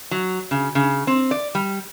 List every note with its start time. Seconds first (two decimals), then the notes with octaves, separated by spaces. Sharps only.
0.11 F#3
0.51 C#3
0.75 C#3
1.07 C4
1.31 D5
1.55 G3